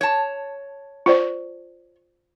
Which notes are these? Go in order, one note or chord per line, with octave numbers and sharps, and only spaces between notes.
C#5 A5
F4 C5 D5